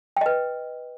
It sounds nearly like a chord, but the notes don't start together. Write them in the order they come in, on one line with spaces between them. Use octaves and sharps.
G5 D#5 B4